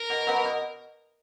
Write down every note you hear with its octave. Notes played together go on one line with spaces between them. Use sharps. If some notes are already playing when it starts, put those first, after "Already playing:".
Already playing: A#4
B2
F#3 B3 D#4
B2